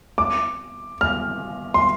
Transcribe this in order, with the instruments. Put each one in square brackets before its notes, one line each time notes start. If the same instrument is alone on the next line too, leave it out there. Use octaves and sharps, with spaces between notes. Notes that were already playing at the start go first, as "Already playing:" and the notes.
[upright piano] D6
F6
C6